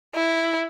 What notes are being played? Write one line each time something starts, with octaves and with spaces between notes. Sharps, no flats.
E4